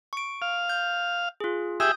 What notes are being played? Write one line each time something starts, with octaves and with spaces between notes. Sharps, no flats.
C#6 D7
F5
G6
F4 G#4
G4 G#4 E5 D#6 G6